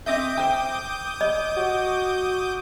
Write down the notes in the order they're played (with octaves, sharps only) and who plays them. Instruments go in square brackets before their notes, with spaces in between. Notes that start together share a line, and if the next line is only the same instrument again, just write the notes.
[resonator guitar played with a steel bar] C4 D#5 E5 [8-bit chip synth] D6 D#6 G6
[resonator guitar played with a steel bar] C5 G5
[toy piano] D#5
[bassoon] F#4